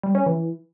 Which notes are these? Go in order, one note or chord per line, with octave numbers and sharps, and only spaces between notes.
G3
C#4
E3